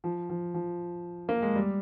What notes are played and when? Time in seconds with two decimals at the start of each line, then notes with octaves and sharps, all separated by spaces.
0.04 F3
0.30 F3
0.54 F3
1.29 A#3
1.42 G#3
1.55 G3